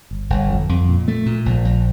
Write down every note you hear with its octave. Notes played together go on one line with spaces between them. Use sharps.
G1
G1
F2
F2
A#2
A3
A#2
A#1
A#1